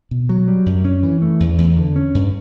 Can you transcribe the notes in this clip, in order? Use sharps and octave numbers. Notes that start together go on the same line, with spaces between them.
B2
F#3
G3
F#2
C#4
E3
A3
E2
E2
D3
C#4
G2